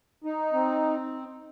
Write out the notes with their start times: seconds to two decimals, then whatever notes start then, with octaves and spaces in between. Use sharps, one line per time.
0.24 D#4
0.53 C4